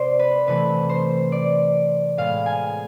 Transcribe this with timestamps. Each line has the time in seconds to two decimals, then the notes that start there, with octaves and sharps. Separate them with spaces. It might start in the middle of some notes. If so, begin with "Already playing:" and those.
Already playing: C3 G#3 C5 D5
0.19 B4
0.47 C3 E3 A3 C4 B4
0.89 C5
1.32 D5
2.17 A2 G#3 B3 F5
2.46 G#5